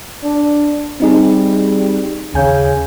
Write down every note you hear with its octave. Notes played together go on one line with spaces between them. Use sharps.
D4
G3 C4 D#4 G#4
D#2 C#3 G#5 G6